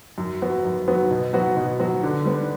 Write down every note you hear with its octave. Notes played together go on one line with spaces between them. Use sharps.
F#2
F#3 B3 F#4
F#2
F#3 B3 F#4
B2
F#3 B3 F#4
B2
F#3 B3 F#4
D3
G3 B3